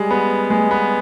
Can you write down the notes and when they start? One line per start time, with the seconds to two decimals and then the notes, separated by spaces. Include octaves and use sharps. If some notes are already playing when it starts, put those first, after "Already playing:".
Already playing: G3 G#3
0.11 B3
0.50 G#3
0.71 B3